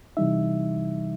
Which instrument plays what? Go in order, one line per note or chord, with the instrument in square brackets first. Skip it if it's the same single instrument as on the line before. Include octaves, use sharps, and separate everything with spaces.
[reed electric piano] C3 E3 G3 D#4 E5